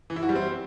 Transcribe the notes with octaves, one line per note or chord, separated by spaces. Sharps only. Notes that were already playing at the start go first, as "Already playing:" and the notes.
E3
E4
F#4
G3
C4